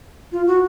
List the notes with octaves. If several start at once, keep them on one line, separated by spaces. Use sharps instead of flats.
F4
F#4